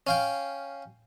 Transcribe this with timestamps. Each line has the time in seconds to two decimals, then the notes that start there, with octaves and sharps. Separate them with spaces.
0.07 C#4 F5 G5